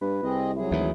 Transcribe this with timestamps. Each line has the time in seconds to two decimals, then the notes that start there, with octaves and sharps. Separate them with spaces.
0.01 G2 B4
0.23 C2 C4 G#4 D#5
0.56 F#3 E4 G#4
0.71 G#1 D2 E3 E4